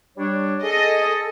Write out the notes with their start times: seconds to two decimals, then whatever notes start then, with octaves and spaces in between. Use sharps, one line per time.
0.17 G3 D4 C#5
0.63 G#4 A4 D#5